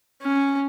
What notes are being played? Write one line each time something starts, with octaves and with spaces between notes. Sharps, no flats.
C#4